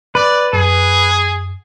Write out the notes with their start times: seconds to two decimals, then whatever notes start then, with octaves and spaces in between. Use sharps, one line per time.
0.15 B4 D5
0.53 F#2 G#4